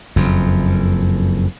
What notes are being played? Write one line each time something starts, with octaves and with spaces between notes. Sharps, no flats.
F#1 F2